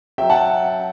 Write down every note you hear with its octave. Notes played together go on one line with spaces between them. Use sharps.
F#3 E5 G5
F#5 A5